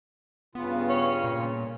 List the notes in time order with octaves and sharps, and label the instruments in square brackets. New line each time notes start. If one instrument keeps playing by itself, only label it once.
[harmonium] G2 C#3 F4 [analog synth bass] B3
[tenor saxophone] C#4
[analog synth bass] A#2